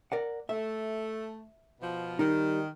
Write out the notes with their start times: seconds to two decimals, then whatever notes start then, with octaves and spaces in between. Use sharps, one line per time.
0.12 A#4 D5 F#5
0.49 A3 E5
1.81 B2 F3
2.19 D#3 G3 D#4